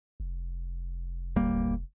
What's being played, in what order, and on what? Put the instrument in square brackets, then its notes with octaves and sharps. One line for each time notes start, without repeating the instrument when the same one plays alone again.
[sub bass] F1
[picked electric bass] D1 G3 A#3